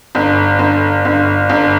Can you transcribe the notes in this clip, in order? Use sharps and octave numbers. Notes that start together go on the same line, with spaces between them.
G1
G1
G1
G1